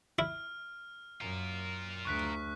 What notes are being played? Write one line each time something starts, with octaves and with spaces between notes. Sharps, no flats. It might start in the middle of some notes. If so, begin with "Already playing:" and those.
E4 F6
F#2 F4 A#4
D2 C#6 F#6 B6